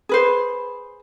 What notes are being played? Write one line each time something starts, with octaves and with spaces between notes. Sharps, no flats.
G#4 B4 C5